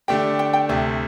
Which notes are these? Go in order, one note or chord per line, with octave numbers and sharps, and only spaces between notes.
D3 A3 D4 G4 G5
G5
G5
D2 C3 A3 G5